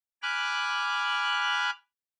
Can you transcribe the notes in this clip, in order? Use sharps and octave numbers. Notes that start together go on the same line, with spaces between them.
G#5 B5 D6 F6 F#6